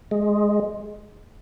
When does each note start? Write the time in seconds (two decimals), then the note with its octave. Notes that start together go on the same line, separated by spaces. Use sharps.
0.11 G#3